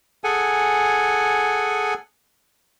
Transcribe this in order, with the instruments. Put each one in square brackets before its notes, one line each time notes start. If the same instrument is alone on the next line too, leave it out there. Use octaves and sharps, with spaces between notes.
[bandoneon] G#4 A4 F#5 G#5